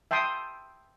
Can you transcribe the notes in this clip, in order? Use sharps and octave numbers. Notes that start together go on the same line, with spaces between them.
E5 G5 A5 C6 D#6